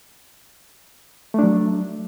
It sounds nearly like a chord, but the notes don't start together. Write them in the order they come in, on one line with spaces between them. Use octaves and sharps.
A3 D4 F#3